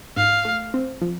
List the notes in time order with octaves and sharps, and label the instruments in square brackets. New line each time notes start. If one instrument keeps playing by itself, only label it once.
[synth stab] G#2 [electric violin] F5
[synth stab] A3
C4
F3